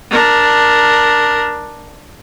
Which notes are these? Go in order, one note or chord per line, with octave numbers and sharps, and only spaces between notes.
D4 A#4